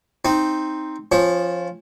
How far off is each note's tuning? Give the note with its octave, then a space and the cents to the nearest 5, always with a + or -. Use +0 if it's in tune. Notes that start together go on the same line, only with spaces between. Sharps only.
C4 +0 D#4 +0
F3 +0 C#4 -20